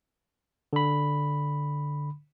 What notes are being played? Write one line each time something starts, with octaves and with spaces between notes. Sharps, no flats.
D3 B5